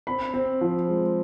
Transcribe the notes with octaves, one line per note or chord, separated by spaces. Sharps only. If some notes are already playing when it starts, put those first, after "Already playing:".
C4 B5
C4
F3
G#3